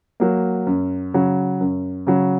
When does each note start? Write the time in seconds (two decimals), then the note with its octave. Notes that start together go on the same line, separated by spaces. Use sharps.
0.20 F#3 A#3
0.67 F#2
1.14 C#3 F#3
1.61 F#2
2.07 C#3 F#3